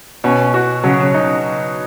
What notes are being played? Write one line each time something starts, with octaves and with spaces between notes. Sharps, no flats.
B2 C#4
F#4
C#3 F#3
D#4